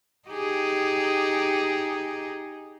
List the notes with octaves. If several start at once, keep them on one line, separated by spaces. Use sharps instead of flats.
D#4 G4 G#4